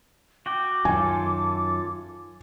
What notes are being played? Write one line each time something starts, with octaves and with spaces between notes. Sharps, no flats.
F#4 G5 D6
F#2 D#3 F4 A4 G#5